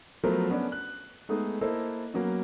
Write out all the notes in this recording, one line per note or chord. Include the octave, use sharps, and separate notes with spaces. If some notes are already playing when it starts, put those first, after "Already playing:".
F3 F#3 A3 B3 A#4 C5
B3 C#4 D4 D5
F#6
G#3 A3 B3 D#4 G#4
A#3 E4 A4 C5 D#5
F#3 A#3 B3 C#4